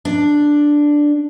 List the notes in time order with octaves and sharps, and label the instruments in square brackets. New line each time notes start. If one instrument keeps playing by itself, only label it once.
[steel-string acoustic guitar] D4